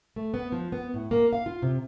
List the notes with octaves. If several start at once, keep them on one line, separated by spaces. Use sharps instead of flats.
A3
B3
F3
B3
A2
A#3
F5
F4
C3